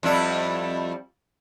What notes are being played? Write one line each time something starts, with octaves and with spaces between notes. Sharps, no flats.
F2 G3 E4